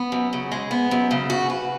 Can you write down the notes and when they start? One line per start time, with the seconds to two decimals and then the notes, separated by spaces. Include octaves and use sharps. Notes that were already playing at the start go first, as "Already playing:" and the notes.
Already playing: B3
0.12 F#2
0.33 C#3
0.52 G#3
0.71 B3
0.91 F#2
1.11 C#3
1.30 F#4
1.50 B4